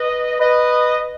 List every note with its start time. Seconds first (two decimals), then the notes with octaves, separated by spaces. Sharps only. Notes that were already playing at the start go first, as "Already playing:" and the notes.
Already playing: B4 D#5
0.39 B4 D#5